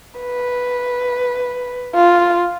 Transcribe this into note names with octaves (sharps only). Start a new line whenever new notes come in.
B4
F4